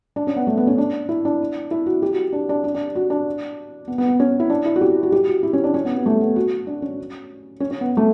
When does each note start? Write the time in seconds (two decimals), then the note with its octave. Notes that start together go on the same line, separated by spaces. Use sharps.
0.16 D4
0.27 C#4
0.36 B3
0.47 A3
0.57 B3
0.67 C#4
0.78 D4
1.09 E4
1.25 D4
1.71 E4
1.86 F#4
2.02 G4
2.13 F#4
2.33 D4
2.49 D4
2.64 D4
2.75 D4
2.95 F#4
3.10 D4
3.88 B3
3.98 B3
4.08 B3
4.20 C#4
4.40 E4
4.50 D4
4.65 E4
4.76 F#4
4.81 G4
5.03 F#4
5.12 G4
5.27 F#4
5.43 E4
5.53 C#4
5.64 D4
5.74 C#4
5.85 B3
5.95 B3
6.06 A3
6.21 B3
6.36 F#4
6.67 D4
6.82 C#4
7.60 C#4
7.71 C#4
7.81 B3
7.97 A3